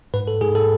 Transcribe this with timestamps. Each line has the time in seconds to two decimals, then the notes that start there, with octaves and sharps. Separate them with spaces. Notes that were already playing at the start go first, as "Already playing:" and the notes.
0.14 G#2 B4
0.28 A4
0.41 G#2 G#4
0.55 A4